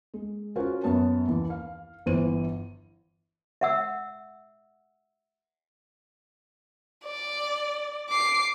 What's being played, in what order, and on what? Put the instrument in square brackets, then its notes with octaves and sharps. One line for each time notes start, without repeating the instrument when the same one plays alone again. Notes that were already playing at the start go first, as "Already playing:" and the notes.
[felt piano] G#3
C#4 F4 F#4 A#4 C5
F#2 B3 C#5 A5
D#2 E3
F5
G1 E3 C5 D#7
[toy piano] E5 F#5 E6
[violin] D5
D6 C7